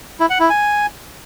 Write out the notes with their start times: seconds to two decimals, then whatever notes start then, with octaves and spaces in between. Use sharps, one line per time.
0.20 E4
0.30 F#5
0.40 E4
0.50 G#5